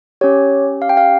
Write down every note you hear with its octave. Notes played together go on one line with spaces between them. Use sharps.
C#4 G4 C#5
F5
G5
F5